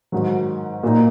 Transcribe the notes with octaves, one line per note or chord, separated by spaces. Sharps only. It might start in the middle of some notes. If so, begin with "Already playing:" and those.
G#2 D#3 F#3
A#2 A#3 D#4